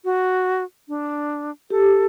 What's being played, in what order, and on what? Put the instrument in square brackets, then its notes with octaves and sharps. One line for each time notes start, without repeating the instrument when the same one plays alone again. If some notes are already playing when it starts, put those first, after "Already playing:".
[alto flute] F#4
D4
[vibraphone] G4 [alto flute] A4